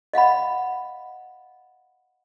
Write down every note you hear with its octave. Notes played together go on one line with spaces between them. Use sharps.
D#5 F5 F#5 B5